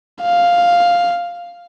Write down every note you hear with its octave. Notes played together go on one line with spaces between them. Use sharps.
F5